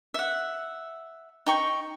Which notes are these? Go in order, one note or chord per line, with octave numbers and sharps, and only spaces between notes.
E5 F#5
D#4 G5 C#6